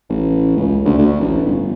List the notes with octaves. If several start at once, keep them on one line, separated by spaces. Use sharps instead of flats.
A1
C#2
D2
D2
A1
G1